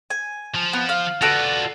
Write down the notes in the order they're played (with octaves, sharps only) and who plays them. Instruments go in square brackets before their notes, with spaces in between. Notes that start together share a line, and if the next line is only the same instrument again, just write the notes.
[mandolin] G#5
[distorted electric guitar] F3
[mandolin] B3
F5
[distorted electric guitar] F4 B4 [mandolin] F#4 A4 D5